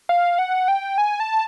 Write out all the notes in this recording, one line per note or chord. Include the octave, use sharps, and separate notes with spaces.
F5
F#5
G5
G#5
A5